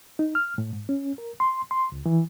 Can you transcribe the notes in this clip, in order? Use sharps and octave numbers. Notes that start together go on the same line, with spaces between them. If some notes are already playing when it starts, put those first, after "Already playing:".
D#4
F6
A2
G#2
C#4
A#4
C6
C6
C#2
E3